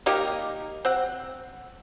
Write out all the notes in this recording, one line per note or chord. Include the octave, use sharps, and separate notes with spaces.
A#3 D#4 G4 A#4
C4 F#5